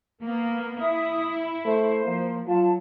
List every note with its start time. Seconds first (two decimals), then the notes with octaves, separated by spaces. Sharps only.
0.21 A#3 B3
0.79 E4 E5 D#6
1.65 A3 C5
2.04 F3 A#3
2.47 F#3 F4 A5